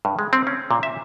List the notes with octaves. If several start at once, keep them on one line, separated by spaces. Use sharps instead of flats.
G2
G#3
C4
C#4
A#2
E5